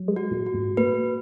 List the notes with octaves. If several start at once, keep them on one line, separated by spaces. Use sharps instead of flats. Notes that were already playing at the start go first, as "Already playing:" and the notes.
Already playing: F#3
G#3
F#4
A#2
F#4
G#2
A#2 B4